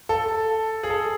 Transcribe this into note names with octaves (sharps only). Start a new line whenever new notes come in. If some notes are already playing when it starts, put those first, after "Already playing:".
A4
G#4
A4